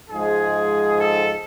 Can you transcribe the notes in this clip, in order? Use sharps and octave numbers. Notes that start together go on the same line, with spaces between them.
G#2 F3 G#3 G#4
A4